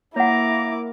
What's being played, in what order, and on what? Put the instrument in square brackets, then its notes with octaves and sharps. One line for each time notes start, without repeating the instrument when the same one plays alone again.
[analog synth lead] A#3 [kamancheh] E4 D6 [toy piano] C#5 F#5 [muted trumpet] A#5